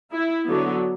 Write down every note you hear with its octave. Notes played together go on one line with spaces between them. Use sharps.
E4
D3 F#3 B3